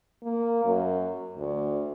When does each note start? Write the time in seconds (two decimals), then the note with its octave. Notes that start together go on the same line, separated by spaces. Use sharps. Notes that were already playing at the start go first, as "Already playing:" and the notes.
0.24 A#3
0.65 F#2
1.38 D2